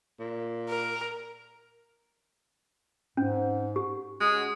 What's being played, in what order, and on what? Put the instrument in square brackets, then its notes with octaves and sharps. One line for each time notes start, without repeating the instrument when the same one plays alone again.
[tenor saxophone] A#2
[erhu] A#4
[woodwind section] G#2 [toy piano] C#4
[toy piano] G4
[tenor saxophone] G#3 [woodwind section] C#4 F#4